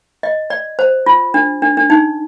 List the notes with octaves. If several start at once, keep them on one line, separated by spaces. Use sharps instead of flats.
D#5
D5
C5
F4
D4
D4
D4
D#4